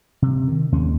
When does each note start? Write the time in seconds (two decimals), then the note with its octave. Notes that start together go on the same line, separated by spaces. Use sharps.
0.22 C3
0.48 D#3
0.72 D#2 G#3 C#4